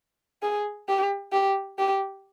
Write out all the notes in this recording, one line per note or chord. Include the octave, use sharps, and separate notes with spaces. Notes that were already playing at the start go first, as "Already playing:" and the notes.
G#4
G4
G4
G4